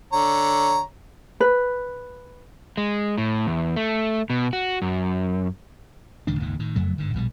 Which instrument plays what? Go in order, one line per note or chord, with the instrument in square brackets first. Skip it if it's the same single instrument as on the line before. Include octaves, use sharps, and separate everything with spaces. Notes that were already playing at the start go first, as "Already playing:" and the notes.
[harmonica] D3 C#5 A#5
[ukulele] B4
[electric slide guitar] G#3
A2
E2
A3
B2
F#4
F#2
[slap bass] D1 C#2 D#3 D4
F#1 D#2 G#2 D#3
A2 D#3
F#1 F2 F#3 A3
G1 G#2 D3
A#1 B2 D#3 G3